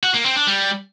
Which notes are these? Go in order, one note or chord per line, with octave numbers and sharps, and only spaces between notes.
F#4
A#3
C4
D4
G3